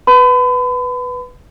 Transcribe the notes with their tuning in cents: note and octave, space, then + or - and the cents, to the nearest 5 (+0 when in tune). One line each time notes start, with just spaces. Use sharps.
B4 +0 B5 +40